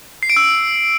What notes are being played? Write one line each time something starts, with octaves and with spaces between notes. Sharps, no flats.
C7
D7
E6